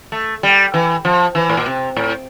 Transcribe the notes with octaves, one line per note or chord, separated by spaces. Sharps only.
A3
G3
E3
F3
E3
A2
A#2
C3
A2